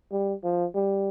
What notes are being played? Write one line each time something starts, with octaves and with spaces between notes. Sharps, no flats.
G3
F3
G3